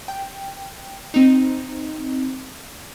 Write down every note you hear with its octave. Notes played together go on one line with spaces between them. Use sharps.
G5
C4 D#4